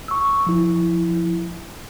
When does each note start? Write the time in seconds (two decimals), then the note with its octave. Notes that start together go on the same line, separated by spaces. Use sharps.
0.08 C#6 E6
0.47 F3 E4